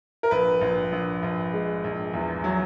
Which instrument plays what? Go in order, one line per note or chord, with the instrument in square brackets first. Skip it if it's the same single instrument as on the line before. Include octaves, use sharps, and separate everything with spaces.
[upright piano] A#4
A#1 B4
A#1
A#1
A#1
G#3
A#1
E2
F#3